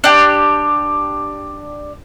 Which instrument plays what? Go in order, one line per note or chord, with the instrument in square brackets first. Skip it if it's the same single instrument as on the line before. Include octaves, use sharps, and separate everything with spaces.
[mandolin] D4 G4